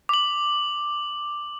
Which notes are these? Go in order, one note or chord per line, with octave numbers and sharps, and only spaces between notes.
D6 F#7